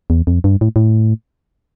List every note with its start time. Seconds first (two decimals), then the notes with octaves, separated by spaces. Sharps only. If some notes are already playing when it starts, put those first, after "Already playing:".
0.10 E2
0.27 F2
0.44 G2
0.61 A2
0.76 A2